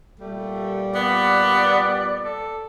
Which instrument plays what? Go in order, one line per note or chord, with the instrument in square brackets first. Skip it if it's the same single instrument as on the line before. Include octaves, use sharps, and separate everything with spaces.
[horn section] A#2 G3 [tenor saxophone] A3
[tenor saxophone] B3 [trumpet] D5
[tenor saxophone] A4